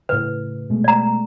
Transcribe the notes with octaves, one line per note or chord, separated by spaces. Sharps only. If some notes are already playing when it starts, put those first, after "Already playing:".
A2 C#3 B4
B2 G#3 A3
D5 A#5